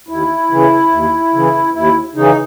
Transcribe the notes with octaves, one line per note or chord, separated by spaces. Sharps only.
D#2 E4
C#3 E3
D#2
C#3 E3
D#2 E4
C#3 E3 D#4